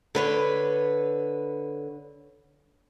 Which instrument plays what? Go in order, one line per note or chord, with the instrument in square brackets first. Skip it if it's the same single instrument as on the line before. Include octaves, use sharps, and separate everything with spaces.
[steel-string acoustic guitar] D3 B4 C#5